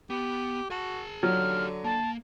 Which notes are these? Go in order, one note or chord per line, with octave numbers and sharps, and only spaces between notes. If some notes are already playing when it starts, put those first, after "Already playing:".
B3 G4
F#4 G#4 A5
D3 F#3 D#4 G4 F6
A#3 A5